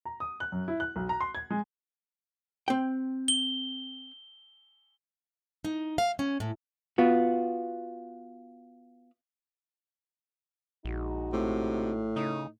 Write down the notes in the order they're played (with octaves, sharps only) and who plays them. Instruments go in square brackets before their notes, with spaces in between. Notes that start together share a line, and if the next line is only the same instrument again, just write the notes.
[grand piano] A#5
D#6
F#6
F#2
E4
F#6
B1
A#5
C6
G#6
G#3
[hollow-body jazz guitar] C4 G5
[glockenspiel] G7
[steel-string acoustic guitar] D#4
F5
C#4
A2
[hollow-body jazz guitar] B3 F4 F#4
[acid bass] A#1 [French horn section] G#3 D#4 F#4
[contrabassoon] A2 [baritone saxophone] C3
[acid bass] C#3 [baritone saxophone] D#4